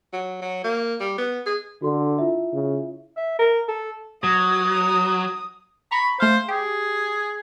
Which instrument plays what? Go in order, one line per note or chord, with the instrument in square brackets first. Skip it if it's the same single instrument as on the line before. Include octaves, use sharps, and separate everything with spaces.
[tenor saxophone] F#3
F#3
A#3
G3
B3
G#4
[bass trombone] D3 [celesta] F#4 A4 C6
[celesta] E4 F4 E5
[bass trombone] C#3
[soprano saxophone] E5
A#4
A4
[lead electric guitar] F#3 [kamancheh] D#6
[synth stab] A#5 C#6 [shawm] B5
[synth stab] A3 F5 [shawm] C5
[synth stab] G4 [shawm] G#4